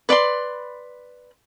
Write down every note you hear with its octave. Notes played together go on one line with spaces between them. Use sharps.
B4 D5 B5 C6